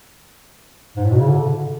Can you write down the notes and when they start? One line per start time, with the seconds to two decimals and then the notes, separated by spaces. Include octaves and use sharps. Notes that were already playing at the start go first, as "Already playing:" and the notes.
0.96 G#2
1.05 A2
1.12 B2
1.20 C#3
1.28 D3